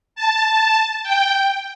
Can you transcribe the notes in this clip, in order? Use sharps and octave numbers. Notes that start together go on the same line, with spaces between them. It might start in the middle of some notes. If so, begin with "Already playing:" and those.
A5
G5